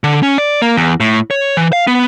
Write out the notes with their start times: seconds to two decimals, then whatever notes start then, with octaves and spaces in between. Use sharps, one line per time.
0.04 D3
0.23 C#4
0.38 D5
0.62 A#3
0.77 E2
1.00 A2
1.31 C#5
1.57 E3
1.73 F5
1.87 B3